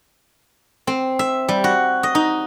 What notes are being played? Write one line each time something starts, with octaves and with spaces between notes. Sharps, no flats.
C4
E5
G3
F#4
D#5
D#4